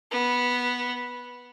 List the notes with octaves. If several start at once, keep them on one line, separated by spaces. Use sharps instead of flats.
B3